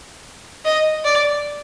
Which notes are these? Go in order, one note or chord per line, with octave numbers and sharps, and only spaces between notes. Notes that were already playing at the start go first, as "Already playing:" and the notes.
D#5
D5